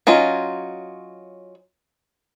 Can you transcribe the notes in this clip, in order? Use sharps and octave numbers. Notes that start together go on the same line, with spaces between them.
F#3 C#4 D#4 F4